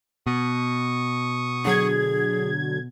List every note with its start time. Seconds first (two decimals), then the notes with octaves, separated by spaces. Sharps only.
0.26 B2 C#6 D#6
1.65 D3 F#3 G#4 G#6